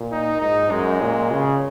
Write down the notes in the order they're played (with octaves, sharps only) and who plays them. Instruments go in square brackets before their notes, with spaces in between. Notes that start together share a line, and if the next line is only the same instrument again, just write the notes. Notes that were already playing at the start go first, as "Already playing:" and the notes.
Already playing: [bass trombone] A#2
[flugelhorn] D#4
[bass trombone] G#2 [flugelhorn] D#4
[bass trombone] F#2 [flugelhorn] G#3
[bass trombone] A#2
C#3